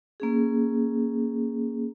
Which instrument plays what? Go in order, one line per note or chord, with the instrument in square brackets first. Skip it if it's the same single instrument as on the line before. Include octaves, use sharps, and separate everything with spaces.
[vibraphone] A#3 C#4 G#4